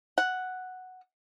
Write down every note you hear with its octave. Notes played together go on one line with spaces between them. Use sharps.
F#5